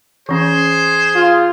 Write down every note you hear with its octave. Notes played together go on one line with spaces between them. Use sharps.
E3 C#4 G#4 C5
F4